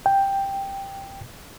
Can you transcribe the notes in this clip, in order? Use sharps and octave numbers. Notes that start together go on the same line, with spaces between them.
G5